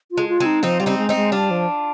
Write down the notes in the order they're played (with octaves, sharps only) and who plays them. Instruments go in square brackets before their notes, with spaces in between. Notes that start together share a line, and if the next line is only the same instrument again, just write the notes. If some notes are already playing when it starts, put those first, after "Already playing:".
[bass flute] F4
[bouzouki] G#3
[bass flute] F4
[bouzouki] G#3 C4
[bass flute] D#4
[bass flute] F3 [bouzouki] C4 D#4
[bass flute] G3 [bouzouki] F4
[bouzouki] C4 D#4
[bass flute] G#3
[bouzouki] C4 D#4
[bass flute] G#3
[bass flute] G3 [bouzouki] D4 F4
[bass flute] F3